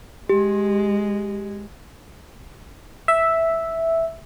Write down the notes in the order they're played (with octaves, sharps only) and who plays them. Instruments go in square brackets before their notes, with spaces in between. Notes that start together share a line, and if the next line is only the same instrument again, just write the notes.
[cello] G#3 [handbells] G4
[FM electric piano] E5